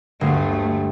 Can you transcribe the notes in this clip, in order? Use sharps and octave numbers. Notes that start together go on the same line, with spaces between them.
G1 D2 A3 C7